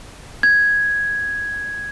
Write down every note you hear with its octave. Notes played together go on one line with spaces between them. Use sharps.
G#6